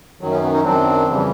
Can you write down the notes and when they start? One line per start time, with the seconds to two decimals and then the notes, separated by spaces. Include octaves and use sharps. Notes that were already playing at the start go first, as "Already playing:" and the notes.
0.21 F#2 D#3 F#3
0.31 B3 C#4
0.43 B3
0.53 C#4 D#4
0.63 F#2 D#3 F#3 C4 D4
1.06 F2 C#3 E3 G3